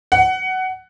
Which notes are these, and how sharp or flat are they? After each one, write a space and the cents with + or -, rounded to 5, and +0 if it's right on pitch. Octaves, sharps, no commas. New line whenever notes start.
F#5 +15